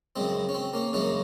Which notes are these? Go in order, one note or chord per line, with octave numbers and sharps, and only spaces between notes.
F#2 C#3 G#3 C4
C#4
C4
A#3 C#4
F#2 C#3 G#3 A#3 C#4